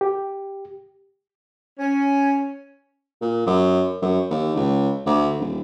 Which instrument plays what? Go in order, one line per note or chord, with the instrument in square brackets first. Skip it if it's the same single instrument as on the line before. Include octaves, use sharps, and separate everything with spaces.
[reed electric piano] G4
[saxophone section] C#4
[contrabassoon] A#2
F#2
F#2
D#2
C#2
D2
D#1